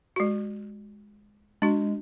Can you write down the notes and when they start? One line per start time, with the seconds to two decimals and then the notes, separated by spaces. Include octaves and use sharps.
0.16 G#3 F#4
1.62 G#3 D4 F#4